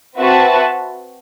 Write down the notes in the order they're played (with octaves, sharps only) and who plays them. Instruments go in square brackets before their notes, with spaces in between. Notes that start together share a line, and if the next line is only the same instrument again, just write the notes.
[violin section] C4 F#4 B4 E5 A5